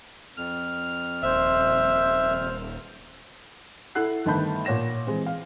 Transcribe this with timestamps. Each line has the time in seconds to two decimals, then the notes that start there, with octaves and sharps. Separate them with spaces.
0.37 F2 F6
1.22 D#1 C5 E5
3.95 E4 A4 F#5 F#6 C7
4.25 G1 D#3 A3 A5 B5 G6
4.65 A#2 C#5 F#5 A#6 E7
5.07 E3 G#3 C4
5.26 F5